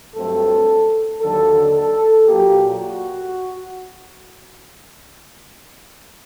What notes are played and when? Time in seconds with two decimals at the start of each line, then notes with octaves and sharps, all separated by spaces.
0.15 G2 F#3 A3 C4 A4
1.21 D#2 D3 F#3 A4
1.75 A4
2.29 A#2 F#3 A#3 G4
2.82 F#4